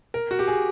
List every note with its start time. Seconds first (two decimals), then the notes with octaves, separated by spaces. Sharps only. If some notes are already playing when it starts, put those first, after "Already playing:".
0.14 A#4
0.31 F#4
0.39 G4
0.47 G#4